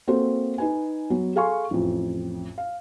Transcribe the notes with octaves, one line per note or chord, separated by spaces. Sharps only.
A#3 C4 F#4 A4 C5
D#4 B4 G#5
F#3 B3
G#4 A4 F5 G#5 C6 C#6
A1 F2
F5